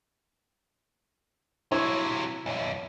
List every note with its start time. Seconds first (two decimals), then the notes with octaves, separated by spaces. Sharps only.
1.72 C3 F#3 E4 C#5
2.46 B1 F#2